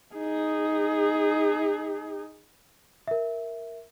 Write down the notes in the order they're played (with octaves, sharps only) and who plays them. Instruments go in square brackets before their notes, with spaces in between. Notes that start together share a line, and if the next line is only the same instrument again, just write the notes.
[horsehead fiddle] D#4 G#4
[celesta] A#4 E5